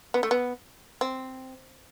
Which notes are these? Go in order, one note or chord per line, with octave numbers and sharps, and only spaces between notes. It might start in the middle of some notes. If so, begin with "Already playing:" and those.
B3
A3
B3
C4